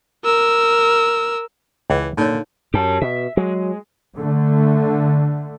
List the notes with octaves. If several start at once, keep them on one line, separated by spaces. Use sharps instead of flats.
A#4 E6
C#2 E3 C#5 F#5
A#2 D3 F#3 D#4 C#5
F#2 G4 A5
B2 E5
F#3 G#3
D3 A3